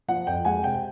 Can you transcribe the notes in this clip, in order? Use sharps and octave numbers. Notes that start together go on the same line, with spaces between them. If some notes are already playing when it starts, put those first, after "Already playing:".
F3 F#5
F2 G5
G#3 F#5 G#5
C3 G5